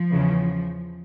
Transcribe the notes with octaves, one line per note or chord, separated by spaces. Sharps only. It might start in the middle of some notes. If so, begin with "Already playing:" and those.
Already playing: F3
E2 C#3 E3